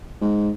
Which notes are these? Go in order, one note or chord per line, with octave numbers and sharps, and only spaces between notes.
G#2